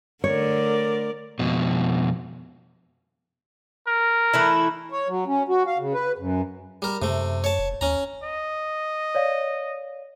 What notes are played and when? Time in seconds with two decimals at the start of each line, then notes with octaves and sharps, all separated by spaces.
0.24 D3 A3 A#4 C#5 D5
1.39 F2 B2
3.87 A#4
4.34 E3 A3 E4
4.90 C#5
5.08 F#3
5.27 C#4
5.48 F#4
5.67 F5
5.79 C#3
5.94 B4
6.18 F#2
6.82 G3 A#4
7.02 F#2 C3 A3
7.44 C#5 A5
7.59 F1
7.81 D#2 C#4 A#5
8.24 D#5
9.15 C#5 D5 F5